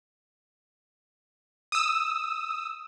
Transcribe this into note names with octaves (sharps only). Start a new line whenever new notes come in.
D#6 E6